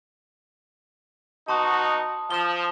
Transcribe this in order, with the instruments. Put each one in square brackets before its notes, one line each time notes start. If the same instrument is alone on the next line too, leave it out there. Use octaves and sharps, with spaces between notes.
[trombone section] B2 D#4 F#4 [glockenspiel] A5 C6 D#6
[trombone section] F3 [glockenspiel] E7 G7